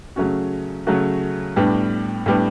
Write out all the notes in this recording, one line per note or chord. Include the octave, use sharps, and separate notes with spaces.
C#3 F#3 A3 C#4 F#4
C#3 F#3 A3 C#4 F#4
A2 G3 B3 D4
A2 G3 B3 D4